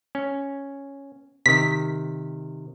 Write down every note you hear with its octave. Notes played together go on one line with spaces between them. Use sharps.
C#4
C3 D#3 B6